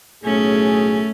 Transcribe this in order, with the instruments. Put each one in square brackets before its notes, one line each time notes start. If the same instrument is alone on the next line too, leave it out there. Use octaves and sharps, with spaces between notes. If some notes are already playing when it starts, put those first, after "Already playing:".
[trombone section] B1 A2 G#4 [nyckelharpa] A3 C#4